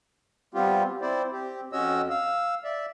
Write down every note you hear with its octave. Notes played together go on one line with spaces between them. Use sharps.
G3 B3 C4 F4 G4
C4 E4 C5 D5
C4 G4
F2 C#4 F#4 C#5 D#5 E6
F5 E6
D5 E5